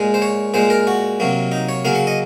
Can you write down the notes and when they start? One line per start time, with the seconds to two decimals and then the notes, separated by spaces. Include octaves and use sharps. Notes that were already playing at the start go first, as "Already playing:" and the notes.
Already playing: A#2 G#3
0.14 C5
0.22 C#5
0.54 A#2 G#3 C5
0.70 A#4
0.87 F#4
1.20 C3 F#3 A#3
1.52 D#4
1.69 C#5
1.85 C#3 F#3 A#3 F5
1.95 F#5
2.07 D#5